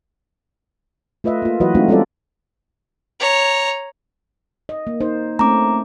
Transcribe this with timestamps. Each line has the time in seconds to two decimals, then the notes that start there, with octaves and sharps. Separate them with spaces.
1.24 A3 F4 B4 D#5 E5
1.42 A#3 F4
1.60 E3 F#3 E4 F#4 B4 D#5
1.74 G#3 A3 C4 D#4 F4 F#4
1.88 G3 C4 C#4 F4 A4 D5
3.19 C#5 A#5
4.69 D#5
4.87 A#3
5.01 D#4 C5
5.39 A3 C4 C#4 A#5 D6